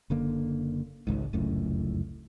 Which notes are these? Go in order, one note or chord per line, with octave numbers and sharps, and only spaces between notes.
F#1 D3 A#3
G#1 C#2 G#2
F1 C#2 F#2 A2